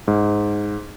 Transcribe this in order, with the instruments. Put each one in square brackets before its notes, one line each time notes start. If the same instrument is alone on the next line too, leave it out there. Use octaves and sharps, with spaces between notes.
[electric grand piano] G#2